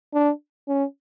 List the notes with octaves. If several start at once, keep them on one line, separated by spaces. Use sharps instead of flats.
D4
C#4